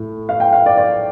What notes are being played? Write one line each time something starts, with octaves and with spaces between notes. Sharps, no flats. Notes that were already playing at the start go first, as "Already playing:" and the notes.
Already playing: A2 A3
F5
G5
F5
D5
D5